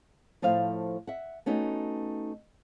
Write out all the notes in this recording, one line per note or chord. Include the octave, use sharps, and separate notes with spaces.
A2 F3 A3 C5 F5
E5 F#5
A3 B3 C#4 D#4 F#4